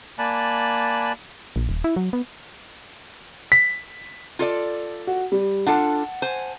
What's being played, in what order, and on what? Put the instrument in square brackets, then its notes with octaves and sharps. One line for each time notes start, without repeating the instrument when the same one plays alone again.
[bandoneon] A#3 D5 G#5 A5 B5 F#6
[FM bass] A#1
D#1
E4
F#3
B3
[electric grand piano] B6
[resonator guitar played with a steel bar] F4 A4 D5
[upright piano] F#4
G3
[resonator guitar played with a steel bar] D4 F4 A4 [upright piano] F#5 A5
[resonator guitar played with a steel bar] C5 G#5